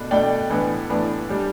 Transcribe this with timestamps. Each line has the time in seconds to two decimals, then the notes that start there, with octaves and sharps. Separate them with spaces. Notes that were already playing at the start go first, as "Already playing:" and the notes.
Already playing: B2 A3 D4
0.11 B2 A3 D4 D5 G5
0.50 A2 E3 B3 D4
0.89 A2 E3 B3 D4
1.30 G3 D4